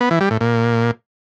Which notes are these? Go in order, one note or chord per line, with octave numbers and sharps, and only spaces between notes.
B3
E3
G3
A2
A#2